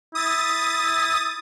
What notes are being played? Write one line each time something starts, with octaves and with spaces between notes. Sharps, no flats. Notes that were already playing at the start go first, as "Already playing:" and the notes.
E4 D#6 A6